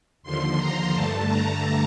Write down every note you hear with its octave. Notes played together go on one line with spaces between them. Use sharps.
D#2 D3 F3 C6
A#5
G2 D3 A3 A5
A#5